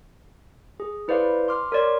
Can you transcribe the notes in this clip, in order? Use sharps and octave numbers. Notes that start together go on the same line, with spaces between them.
G#4
E4 B4 C5 D5 F5
C6 D6 F6
A#4 C#5 D5 C6